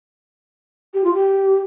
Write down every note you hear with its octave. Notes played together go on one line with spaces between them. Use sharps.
G4
F4
G4